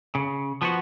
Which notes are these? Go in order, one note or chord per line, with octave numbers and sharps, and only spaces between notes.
C#3
F3 B3 F#4